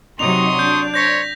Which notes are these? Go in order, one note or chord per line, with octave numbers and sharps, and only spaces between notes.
C3 F#3 D#4 C6 C#6 D#6 F7
D4 G6
C5 C#5 G6 A#6 B6